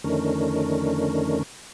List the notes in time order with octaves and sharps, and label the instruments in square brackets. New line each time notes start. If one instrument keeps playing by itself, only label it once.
[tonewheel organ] F2 D3 D#3 A3 C#4 A#4